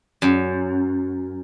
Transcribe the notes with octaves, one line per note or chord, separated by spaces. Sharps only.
F#2